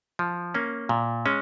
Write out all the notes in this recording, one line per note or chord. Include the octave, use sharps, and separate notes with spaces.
F3
A#3 C#4
A#2
G#3 C#4